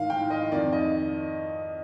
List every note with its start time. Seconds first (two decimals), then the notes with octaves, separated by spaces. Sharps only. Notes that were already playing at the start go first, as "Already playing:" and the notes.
Already playing: G#2 D#3 F5
0.10 G5
0.30 D#5
0.52 F2 D#3 D5
0.73 D#5